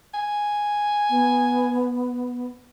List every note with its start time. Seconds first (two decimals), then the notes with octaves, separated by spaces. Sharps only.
0.14 G#5
1.10 B3